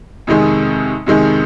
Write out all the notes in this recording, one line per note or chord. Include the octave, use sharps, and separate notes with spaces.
F2 C3 D#3 G#3
F2 C3 D#3 G#3